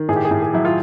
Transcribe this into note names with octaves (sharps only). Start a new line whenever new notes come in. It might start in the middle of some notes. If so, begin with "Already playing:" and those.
Already playing: D#3
A2 G#4
G4
G#4
A2
G#4
F#3 E4
F4